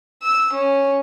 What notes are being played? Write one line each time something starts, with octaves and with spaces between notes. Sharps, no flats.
E6
C#4